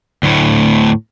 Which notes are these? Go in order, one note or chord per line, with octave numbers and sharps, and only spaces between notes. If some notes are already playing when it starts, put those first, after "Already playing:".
D2 A2